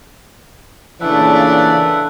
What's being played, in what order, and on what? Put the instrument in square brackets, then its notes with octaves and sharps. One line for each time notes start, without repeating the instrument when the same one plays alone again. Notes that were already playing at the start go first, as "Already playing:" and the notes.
[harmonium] A#2 C#3 [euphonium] E3 [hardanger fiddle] A3 D4 [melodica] B4 E5 F#5